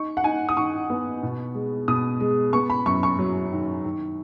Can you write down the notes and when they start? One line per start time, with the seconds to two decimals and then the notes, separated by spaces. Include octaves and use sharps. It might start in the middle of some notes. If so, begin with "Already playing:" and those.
Already playing: D#4 C#6
0.17 F#5
0.24 D#4 G#5
0.49 D#6
0.57 D#3 C#6
0.90 B3
1.23 B2
1.55 G#3
1.88 B2 D#6
2.20 G#3
2.53 B3 C#6
2.70 B5
2.86 F#2 C#6
3.03 C#6
3.19 F#3
3.52 D#3
3.84 D#3